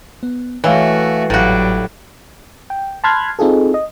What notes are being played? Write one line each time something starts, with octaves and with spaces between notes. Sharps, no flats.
B3
E3 A3 F#4 C#5 E5 F5
G#1 A2 F#3 G3 F#4 F5
G5
A5 B5 C6 F6 F#6 G#6
C4 D#4 F4 G#4 A4
D#5